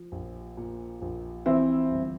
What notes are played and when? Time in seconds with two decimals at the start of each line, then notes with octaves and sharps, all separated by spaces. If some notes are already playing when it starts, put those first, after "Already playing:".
Already playing: F3
0.12 A#1
0.57 A#2
1.02 A#1
1.46 E3 C4 E4
1.91 G1